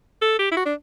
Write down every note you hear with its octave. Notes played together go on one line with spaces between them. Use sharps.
A4
G4
E4
F#4
D4